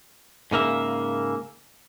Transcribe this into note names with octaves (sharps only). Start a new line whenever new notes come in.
G#2 C#3 A#3 E5